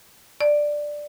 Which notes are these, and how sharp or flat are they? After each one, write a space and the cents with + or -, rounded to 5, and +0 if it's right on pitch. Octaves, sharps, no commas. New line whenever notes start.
D5 +5